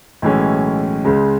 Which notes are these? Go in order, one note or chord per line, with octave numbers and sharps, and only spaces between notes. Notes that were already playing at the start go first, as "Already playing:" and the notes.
B1 A2 E3 G#3 C#4
C#2 C#3 G#3